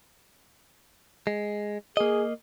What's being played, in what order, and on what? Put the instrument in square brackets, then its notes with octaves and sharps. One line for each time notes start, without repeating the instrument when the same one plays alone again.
[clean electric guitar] G#3
[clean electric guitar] A#3 D#5 [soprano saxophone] G#4